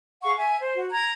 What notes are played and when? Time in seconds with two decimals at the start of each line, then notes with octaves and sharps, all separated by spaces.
0.22 G#4 F5 F#5 C#6
0.36 E5 G#5
0.58 C5
0.74 F#4
0.92 A#5 G#6